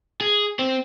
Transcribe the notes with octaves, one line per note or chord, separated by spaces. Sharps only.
G#4
C4